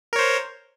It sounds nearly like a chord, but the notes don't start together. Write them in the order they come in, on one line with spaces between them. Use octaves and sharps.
A#4 C#5 C5